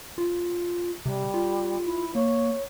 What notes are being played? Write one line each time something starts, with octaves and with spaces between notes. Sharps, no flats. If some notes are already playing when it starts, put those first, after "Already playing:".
F4
C3 G3
F4
E4
A#3 C#5